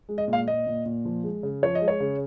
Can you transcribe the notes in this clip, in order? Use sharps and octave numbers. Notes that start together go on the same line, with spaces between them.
G#3
D#5
A#2
F5
A#2 D#5
A#2
A#2
F3
G#3
C#3
F3 C#5
D#5
G#3
C#5
C#3